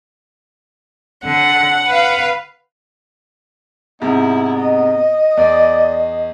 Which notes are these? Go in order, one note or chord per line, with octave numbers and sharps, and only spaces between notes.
D3 F#5
B4 F5
G#2 C3 B3 E4
D#5
E2 D5